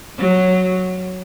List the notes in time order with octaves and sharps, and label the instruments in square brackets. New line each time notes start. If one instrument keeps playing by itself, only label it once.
[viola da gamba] F#3